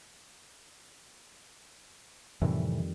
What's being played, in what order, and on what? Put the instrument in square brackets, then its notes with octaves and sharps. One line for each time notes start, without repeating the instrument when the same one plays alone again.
[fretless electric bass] F2 D#3 G3 [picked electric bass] A2 C3 E3